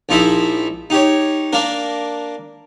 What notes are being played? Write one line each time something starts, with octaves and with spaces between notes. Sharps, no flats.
A#1 F3 D#4 E4 E5
D#4 G4 C#5
A#3 D4 A#4